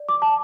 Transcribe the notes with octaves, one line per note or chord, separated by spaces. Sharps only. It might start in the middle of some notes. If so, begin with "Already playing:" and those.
Already playing: D5
D6
A5